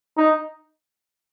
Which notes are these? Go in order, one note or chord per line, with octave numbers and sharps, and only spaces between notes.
D#4